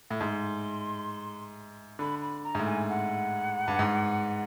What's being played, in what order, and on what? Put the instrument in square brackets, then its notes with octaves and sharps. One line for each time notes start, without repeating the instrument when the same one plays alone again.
[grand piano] A2
[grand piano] G#2 [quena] C6
[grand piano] D3 [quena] B5
[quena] B5
A#5
[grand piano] G#2
A2
[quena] G#5
F#5
[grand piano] G2
G#2